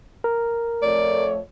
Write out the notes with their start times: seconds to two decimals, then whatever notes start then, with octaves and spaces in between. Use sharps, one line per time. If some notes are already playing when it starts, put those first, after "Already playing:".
0.24 A#4
0.82 F2 A3 C#5 D5